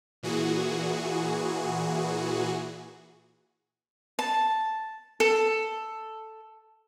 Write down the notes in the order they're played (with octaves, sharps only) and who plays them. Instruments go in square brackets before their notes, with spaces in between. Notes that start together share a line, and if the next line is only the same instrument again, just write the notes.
[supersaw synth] A#2 E3 F#4 G#4
[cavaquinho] A5
A4